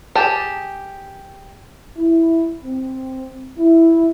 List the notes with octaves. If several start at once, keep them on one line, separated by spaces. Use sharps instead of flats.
G4 G#4 A5
E4
C4
E4